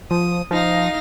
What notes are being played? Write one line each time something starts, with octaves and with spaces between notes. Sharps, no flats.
F3 D#6
F3 D#4 F5 A#6